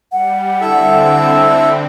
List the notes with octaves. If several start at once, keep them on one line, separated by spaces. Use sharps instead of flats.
G3 F#5
D3 C4 E4 A4 E5